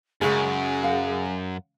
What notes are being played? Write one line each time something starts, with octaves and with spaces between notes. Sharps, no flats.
F#2 C#3 G#3 G#4
F5 F#5